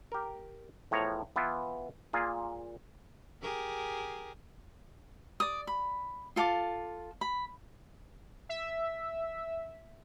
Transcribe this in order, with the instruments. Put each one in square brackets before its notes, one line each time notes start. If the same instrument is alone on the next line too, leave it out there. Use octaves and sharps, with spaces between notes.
[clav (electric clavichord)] G4 A#4
E2 A2 F3 C#5 A#5
E3 B3 E4 F4
A#2 A#3 F4 G#4
[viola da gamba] G4 G#4 A#4
[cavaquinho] D5 D#6
B5
F4 A4 F5 D6
B5
[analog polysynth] E5